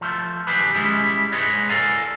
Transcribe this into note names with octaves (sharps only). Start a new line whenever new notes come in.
F3 A3
D#3 F#3 G4 G#4 B4 B5
G3 G#3 C#4 E4 G#4
G#3 G#4 B4 C#5 D#5
A4 A#4 D5 F5 G#5 A#5